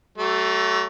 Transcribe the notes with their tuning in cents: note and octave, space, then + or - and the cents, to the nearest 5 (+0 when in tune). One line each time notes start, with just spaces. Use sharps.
F#3 +40 A3 +0